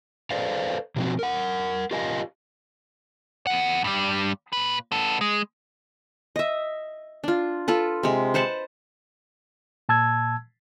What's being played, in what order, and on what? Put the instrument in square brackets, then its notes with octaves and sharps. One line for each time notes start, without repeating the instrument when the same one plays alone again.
[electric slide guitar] A4 B4 C5 D5 F5
B2 F3 F#3 A#3 C4 F#4
A#4 F#5
F4 G4 A#4 D#5 F5 G#5
[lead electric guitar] E2 F#5
G2 G3
A#2 B4
B3 A4
G#3
[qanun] D#5 E5
D4 F4
F4 A4 B4
C3 G#3
B4 C5 F#5 A5
[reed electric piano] A#2 A5 E6 G#6